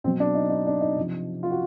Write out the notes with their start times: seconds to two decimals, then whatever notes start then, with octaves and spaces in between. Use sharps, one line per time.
0.04 B2 C4
0.07 F#3
0.20 D4
0.35 D#4
0.50 D#4
0.67 D4
0.81 D#4
0.96 C3 F3
1.43 F4
1.51 F#4